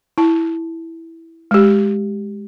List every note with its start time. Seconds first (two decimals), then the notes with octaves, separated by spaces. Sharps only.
0.18 E4 A5
1.51 G#3 G4